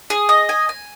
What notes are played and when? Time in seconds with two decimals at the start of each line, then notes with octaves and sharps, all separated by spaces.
0.10 G#4
0.29 D#5
0.49 G#5
0.69 G#5